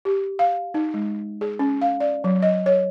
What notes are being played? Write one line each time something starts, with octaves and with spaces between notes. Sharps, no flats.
G4
F5
D#4
G#3
G#4
C#4
F5
D5
F#3
D#5
C#5